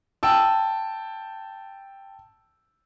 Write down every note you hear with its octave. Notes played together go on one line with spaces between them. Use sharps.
G5 A5 E6